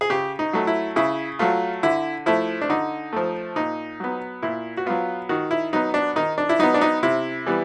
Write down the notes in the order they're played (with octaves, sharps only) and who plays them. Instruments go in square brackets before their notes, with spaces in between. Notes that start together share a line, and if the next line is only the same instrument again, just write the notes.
[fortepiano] G#4
C#3 G4
D#4
F#3 A3
E4
C#3 E4
F#3 A3 F4
D3 E4
F3 A3 E4
D4
D3 D#4
F3 A3
A#2 D#4
F#3 B3
A#2 E4
F#4
F#3 B3 F4
D#3 F#4
E4
F#3 B3 D#4
D4
D#3 D#4
D4
E4
F#3 B3 D#4
D4
D#4
C3 E4
E3 G3 B3